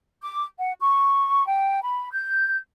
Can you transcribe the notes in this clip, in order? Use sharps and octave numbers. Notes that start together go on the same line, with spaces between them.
D6
F#5
C#6
G5
B5
G6